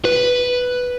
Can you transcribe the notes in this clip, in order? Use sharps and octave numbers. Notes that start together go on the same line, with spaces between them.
B4